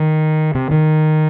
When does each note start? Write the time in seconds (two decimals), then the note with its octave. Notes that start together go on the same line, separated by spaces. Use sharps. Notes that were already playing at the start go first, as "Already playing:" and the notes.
Already playing: D#3
0.55 C3
0.71 D#3